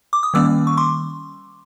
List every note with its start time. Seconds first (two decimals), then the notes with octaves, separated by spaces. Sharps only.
0.13 D6
0.23 D#6
0.34 D#3 G3 A#3 C#4 D6 E6
0.67 C#6
0.77 C6 D6